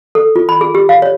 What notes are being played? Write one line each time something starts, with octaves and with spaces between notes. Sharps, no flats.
A4
F4
B5
G#4
G4
F5
C#5